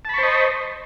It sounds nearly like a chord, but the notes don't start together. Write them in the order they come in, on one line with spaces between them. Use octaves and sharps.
A5 B5 C#6 C5 D#5